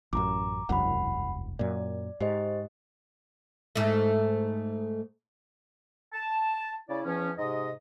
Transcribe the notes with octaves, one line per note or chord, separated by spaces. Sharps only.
A1 F#2 A#5 D6
E1 C2 F#2 F#5 B5
F#2 A#2 D5
G#2 G4 C5 D#5
G#2 A3
A5
C#3 E4 D5
E2 F3 C#4
G#2 C3 D#5